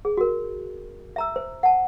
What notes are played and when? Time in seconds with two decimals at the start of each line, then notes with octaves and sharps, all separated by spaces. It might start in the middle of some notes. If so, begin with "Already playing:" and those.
0.05 G#4
0.17 F#4 A#4
1.16 E5 A#5 E6
1.36 C5
1.63 F#5 A5